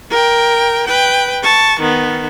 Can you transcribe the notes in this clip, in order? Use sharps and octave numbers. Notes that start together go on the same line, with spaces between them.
A#4 G5
B4 G5
A5 C#6
D#3 B3